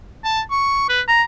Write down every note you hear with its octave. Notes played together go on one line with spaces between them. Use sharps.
A5
C#6
B4
A#5